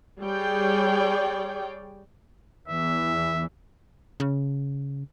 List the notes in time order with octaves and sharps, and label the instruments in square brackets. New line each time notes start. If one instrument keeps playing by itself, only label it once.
[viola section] G3 G#4 C#5 D5 G5
[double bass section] E2 E3 [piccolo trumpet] E5
[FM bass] C#3